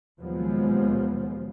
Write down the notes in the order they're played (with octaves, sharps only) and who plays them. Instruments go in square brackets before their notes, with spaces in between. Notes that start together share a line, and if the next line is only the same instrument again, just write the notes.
[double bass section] D#2 B2 F3 F#3 G#3 B3